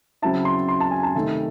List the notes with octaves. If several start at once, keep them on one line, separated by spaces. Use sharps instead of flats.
C#3 F#3 C4 E4 A5
C6
C6
A5
G#5
A5
C3 D#3 A3 D#4 A5